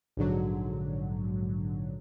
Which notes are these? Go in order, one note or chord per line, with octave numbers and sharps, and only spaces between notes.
A#1 G#2 D3 F#3